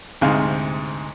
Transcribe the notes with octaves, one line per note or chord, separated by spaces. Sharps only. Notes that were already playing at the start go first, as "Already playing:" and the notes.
D2 G#2 C3 G#4 F5